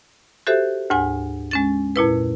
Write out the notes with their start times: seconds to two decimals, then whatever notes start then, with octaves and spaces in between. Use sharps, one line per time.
0.47 F#4 G4 A4 C5 E5
0.90 D2 G#2 F#5 G#5
1.51 G#3 C#4 A6
1.96 F2 A#2 E4 B4